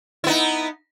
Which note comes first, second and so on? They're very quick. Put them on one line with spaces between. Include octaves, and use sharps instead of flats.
E4 B3 D#4